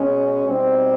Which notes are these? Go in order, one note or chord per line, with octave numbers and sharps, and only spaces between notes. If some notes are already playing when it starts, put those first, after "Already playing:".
Already playing: B2 G#3 C#4
B2 G3 C4 D#4